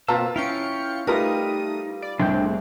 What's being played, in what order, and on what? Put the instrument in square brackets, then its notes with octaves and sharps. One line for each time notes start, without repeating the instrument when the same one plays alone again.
[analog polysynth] B2 A#3 C4 [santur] F4 [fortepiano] B4 A5 A#5 [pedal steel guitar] E6
[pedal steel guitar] C#4 E4 [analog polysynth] F5 G5 C#7
[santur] G3 [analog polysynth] A3 D#6 [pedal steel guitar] D#4 [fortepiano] F4 A#4 B4
[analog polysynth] D5
[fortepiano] C2 [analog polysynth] A2 G#3 C4 [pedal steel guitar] D4 G5 G6